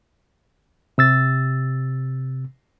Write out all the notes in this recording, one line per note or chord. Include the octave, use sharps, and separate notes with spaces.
C3 E6 A6